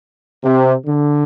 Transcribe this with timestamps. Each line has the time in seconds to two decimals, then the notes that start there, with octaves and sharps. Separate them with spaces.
0.42 C3
0.85 D3